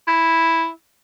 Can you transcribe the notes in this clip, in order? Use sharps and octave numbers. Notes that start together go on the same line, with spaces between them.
E4